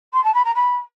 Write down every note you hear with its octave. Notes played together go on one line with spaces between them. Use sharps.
C6
A5
B5
A#5
B5